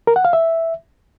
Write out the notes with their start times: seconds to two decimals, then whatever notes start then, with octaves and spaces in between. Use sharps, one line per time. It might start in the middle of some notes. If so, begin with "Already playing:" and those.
0.07 A#4
0.16 F#5
0.25 F5
0.33 E5